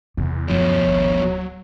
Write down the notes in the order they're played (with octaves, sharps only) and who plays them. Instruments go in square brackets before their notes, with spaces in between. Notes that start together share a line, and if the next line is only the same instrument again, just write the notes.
[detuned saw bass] E2 [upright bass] C3
[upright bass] D1 [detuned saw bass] F#2 [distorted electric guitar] B2 F3 [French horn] C#5
[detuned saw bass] G#1
F#3